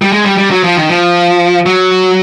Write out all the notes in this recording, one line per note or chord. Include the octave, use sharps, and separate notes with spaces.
G3
G#3
G3
G3
F#3
F3
D#3
F3
F#3